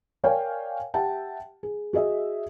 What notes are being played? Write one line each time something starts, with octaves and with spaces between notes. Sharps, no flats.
A#4 C#5 D5 F5 G5 G#5
G4 E5 F#5 G5 A5
G#4
F#4 G#4 D#5 E5